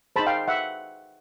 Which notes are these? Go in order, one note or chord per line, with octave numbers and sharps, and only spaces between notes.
D#4 G#4 C5 A5 B5
F5 G5
E5 F#5